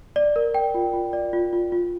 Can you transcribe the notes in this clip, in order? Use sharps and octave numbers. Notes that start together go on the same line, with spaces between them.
D5
A#4
G5
F4
F4
D5
F4
F4
F4